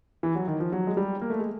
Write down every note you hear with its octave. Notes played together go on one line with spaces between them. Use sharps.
E3
F#3
D#3
F3
F#3
G#3
G3
A#3
A3
G#3